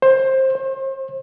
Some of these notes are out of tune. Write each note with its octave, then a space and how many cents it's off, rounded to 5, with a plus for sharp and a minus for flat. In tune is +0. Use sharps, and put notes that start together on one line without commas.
C5 +20
C5 +45